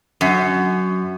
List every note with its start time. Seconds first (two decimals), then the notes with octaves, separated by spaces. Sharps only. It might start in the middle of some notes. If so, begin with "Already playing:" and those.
0.21 F#2